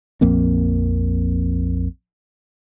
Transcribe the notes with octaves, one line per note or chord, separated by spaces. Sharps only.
A#1 F2 A#3 C4